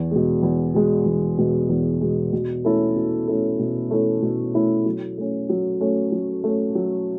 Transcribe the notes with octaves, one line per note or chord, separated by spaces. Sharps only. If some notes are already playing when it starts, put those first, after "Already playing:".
Already playing: E2
B2 G#3
E2
B2 G#3
E2
B2 G#3
E2
B2 G#3
B2
A3 C#4 E4 A4
B2
A3 C#4 E4 A4
B2
A3 C#4 E4 A4
B2
A3 C#4 E4 A4
F#3
A3 C#4
F#3
A3 C#4
F#3
A3 C#4
F#3